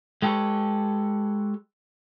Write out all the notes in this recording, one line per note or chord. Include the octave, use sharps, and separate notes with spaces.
G#3 G4 A4 B4 C#5